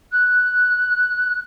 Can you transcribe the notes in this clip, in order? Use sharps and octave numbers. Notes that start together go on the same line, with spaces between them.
F#6